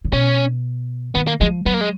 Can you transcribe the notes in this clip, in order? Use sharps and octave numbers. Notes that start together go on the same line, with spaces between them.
C#3
B2 C#4
D#3 B3
A#3
F3 G#3
F#3 B3
A#3
G#3